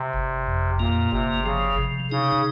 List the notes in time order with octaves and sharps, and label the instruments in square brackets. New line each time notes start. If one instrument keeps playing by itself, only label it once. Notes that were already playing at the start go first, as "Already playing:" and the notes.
Already playing: [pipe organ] C3
[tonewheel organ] G1
F2
[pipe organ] A#2 [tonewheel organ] A#3
[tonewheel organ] G1 [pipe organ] C3
[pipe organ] C#3 [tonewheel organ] F3
[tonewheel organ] C3
[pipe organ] C#3 [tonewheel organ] D#4